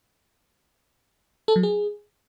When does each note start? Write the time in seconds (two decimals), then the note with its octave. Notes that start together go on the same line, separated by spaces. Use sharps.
1.48 A4
1.56 F#3
1.63 G#4